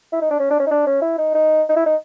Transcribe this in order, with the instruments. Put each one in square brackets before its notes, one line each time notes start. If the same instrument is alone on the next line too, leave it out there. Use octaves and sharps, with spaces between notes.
[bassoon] E4
D#4
D4
C#4
D4
C#4
D#4
D4
C#4
E4
D#4
D#4
D#4
E4
D#4